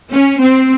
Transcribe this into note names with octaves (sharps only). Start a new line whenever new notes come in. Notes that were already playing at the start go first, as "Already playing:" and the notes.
C#4
C4